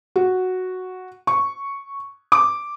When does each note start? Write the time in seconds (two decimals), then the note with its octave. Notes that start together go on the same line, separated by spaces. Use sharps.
0.16 F#4
1.27 C#6
2.32 D6